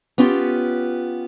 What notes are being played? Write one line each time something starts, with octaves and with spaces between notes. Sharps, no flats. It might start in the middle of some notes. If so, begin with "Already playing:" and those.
B3 C#4 F4 G4